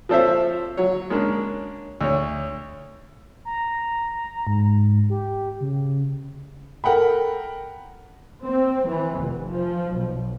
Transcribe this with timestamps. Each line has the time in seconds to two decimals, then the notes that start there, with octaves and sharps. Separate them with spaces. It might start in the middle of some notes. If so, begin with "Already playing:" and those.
0.09 F3 C4 A4 C5 C#5 E5
0.77 F#3 C#5
1.10 G#3 A#3 C#4 D4
2.01 D2 C#5
3.45 A#5
4.47 G#2
5.10 G4
5.61 C#3
6.84 A4 A#4 F#5 G5 B5
8.44 C4
8.88 E3
9.19 F1
9.51 F3
9.95 B1